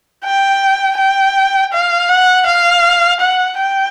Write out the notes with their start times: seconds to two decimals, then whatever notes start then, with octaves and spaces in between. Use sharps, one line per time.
0.25 G5
0.98 G5
1.73 F5
2.09 F#5
2.46 F5
3.20 F#5
3.58 G5